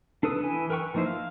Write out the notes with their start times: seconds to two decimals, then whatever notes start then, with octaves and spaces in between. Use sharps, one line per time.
0.23 D4 A4 B4 D#6
0.43 E3 E4 G#5
0.70 A#4 B4 G5 C#6
0.95 F3 A#3 D#4 E4 C5
1.06 F5